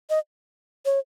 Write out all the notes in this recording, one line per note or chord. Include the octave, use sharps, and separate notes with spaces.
D#5
C#5